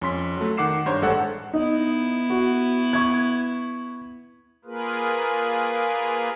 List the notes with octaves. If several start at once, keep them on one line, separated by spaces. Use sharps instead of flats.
F2 C#4 C6 B6
F#3 A3
D#3 F#5 D6 C7 E7
G2 C5 C#5 A#5
A1 G3 G#3 A4 C#5 F#5
B3 D#4 E4
F#4
C#6 G#6
A#3 F4 G#4 A#4 B4